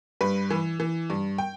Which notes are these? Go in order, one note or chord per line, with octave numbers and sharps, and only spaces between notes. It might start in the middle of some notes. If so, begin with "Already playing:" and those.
G2 B4
E3
E3
G2
G5